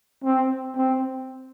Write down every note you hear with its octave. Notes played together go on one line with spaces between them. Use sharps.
C4
C4